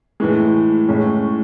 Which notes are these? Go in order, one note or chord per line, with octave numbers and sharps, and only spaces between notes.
A2 E3 G#3
A2 G#3 C#4